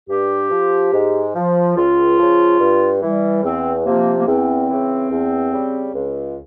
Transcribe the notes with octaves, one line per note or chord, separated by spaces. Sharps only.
G2 G4
F3
G#2
F3
C#2 F4
C#3 F3
G2
E3 G3
E2 C4
C3 F3 A#3
A#3
E2 C4
C#3 E3
E2
C#3 G3
C#2